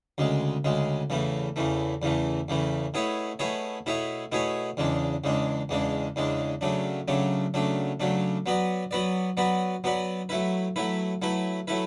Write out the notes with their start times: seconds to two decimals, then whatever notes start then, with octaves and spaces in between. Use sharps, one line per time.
0.18 D2 C#3 G#3
0.64 D2 C#3 G#3
1.10 E2 C#3 E3 A3
1.56 E2 C#3 E3 A3
2.02 E2 C#3 E3 A3
2.48 E2 C#3 E3 A3
2.94 B2 A3 E4 G#4 C#5
3.39 B2 A3 E4 G#4 C#5
3.86 B2 A3 E4 G#4 C#5
4.32 B2 A3 E4 G#4 C#5
4.77 E2 C#3 G#3 D4
5.24 E2 C#3 G#3 D4
5.69 E2 C#3 G#3 D4
6.16 E2 C#3 G#3 D4
6.61 C#3 F#3 A3 D4
7.08 C#3 F#3 A3 D4
7.54 C#3 F#3 A3 D4
8.00 C#3 F#3 A3 D4
8.46 F#3 B3 F#4 B4 D5
8.91 F#3 B3 F#4 B4 D5
9.37 F#3 B3 F#4 B4 D5
9.84 F#3 B3 F#4 B4 D5
10.29 F#3 A3 E4 B4
10.76 F#3 A3 E4 B4
11.22 F#3 A3 E4 B4
11.68 F#3 A3 E4 B4